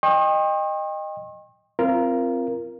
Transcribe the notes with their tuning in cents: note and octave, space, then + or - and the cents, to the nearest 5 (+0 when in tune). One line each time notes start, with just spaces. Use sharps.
D#5 -10 G5 +25 C#6 -45
C4 +0 F4 -25 A#4 +10